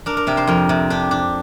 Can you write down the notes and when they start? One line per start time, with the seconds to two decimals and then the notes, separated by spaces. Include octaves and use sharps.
0.06 D4 A#4
0.17 A#4
0.27 C3 G4
0.37 C5
0.47 F2 A#4
0.69 C3
0.90 D4 G4
1.11 D4